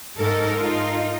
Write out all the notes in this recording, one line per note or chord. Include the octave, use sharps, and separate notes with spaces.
G#2 D#4 A4 A#4
D#4 F4